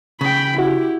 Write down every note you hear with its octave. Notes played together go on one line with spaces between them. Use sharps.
C#3 G5 B5
E4 F#4 G4